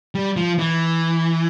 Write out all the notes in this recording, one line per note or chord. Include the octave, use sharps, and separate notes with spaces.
G3
F3
E3